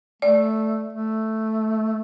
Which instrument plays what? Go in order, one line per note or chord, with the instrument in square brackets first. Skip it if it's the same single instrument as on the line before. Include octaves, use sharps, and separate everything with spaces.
[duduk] A3 [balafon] D5
[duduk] A3